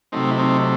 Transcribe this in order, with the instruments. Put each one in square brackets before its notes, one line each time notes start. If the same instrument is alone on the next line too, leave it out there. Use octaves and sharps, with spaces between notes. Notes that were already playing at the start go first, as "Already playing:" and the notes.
[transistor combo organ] C3 F#3 A3 C4 D#4
E4
C4 D#4